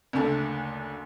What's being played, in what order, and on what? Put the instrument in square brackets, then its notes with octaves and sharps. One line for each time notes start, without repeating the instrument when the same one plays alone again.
[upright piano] F#1 D2 A3